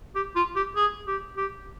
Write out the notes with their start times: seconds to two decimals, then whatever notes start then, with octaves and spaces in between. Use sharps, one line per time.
0.15 G4
0.36 F4
0.56 G4
0.76 G#4
1.07 G4
1.37 G4